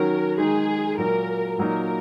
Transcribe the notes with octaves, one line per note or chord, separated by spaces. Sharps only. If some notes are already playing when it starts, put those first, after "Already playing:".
Already playing: D#3 F#3 C#4 F#4 A#4
D#3 G#3 D#4 G#4
A#2 F#3 A#3 A#4
A#2 F#3 A#3 D#4 A#4